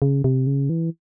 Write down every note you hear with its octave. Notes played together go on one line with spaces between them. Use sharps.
C#3
C3
C#3
E3